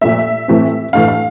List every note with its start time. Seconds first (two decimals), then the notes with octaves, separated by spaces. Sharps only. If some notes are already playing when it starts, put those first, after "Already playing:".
0.01 A#2 F3 A3 E5
0.48 A2 E3 A3 C4
0.93 A2 E3 A3 D4 F5
1.08 F5